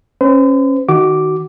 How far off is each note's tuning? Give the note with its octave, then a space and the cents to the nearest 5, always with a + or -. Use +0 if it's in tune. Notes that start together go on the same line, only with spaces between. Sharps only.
C#4 -25 C5 -45
D#3 +0 F#4 +20 D6 +0